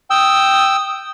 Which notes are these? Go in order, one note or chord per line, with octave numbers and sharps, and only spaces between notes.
G5 D#6 E6